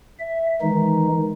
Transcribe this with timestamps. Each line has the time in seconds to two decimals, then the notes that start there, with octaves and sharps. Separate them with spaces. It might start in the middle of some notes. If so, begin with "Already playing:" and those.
0.19 E5
0.62 D#3 E3 G#3 D#4